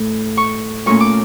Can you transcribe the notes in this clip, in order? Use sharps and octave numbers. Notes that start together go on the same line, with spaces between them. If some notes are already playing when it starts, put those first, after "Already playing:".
Already playing: A2
C#6
A#2 A3 C#4 C#6
D6